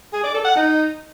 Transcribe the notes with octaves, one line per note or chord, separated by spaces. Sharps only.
G#4
D5
A4
F#5
D#4